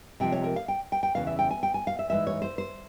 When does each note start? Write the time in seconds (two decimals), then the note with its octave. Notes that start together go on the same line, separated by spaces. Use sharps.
0.20 C3 F3 G#3 G5
0.32 C#5
0.44 A#4
0.56 F5
0.68 G5
0.92 G5
1.03 G5
1.15 E2 C#3 E3 F5
1.27 E5
1.39 G5
1.51 G#5
1.63 G5
1.74 G#5
1.87 F5
1.99 E5
2.10 G#2 E3 G#3 E5
2.27 C#5
2.42 C5
2.58 C5